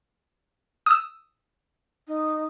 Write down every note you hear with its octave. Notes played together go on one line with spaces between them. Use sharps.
D#6 E6
D#4